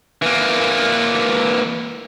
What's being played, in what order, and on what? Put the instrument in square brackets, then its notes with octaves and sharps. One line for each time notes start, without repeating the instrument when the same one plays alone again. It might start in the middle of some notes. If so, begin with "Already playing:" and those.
[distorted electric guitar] E3 A#3